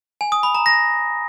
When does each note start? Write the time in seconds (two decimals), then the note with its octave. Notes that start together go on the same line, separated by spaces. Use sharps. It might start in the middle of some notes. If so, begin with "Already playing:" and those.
0.21 G#5
0.32 D#6
0.43 B5
0.55 A#5
0.66 A#6